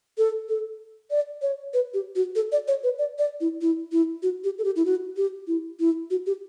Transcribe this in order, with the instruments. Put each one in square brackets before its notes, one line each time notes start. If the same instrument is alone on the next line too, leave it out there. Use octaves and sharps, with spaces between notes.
[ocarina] A4
A4
D5
C#5
B4
G4
F#4
A4
D5
C#5
B4
D5
D5
E4
E4
E4
F#4
G4
A4
G4
E4
F#4
G4
E4
E4
F#4
G4